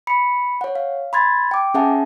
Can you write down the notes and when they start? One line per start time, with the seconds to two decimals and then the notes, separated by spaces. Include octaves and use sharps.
0.07 B5 C#7
0.61 C#5 F#5
0.75 F5
1.13 B5 C6 G#6 A6
1.51 G5 D6
1.74 C#4 G#4 E5 F#5 G#5 A5